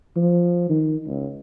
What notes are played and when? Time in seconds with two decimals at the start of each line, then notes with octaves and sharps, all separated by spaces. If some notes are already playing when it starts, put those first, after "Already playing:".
0.16 F3
0.69 D#3
1.07 C#2